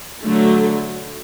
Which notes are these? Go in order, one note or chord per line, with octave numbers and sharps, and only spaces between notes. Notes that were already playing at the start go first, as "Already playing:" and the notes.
D3 F#3 A3